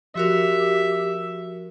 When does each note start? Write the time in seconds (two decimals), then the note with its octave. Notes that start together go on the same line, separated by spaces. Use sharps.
0.15 F3 F#4 G4 A#4 E5